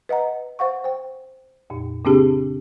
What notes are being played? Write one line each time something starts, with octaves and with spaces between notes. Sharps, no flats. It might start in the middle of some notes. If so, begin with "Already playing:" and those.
B4 D#5 F#5 A#5
C5 F5 F#5 C#6
C5 G5
F2 A#2
C#3 A#3 C4 D4 G4 G#4